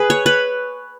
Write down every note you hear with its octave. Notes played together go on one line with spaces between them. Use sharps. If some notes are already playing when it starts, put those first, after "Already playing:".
Already playing: G#4 B4
C#5
B4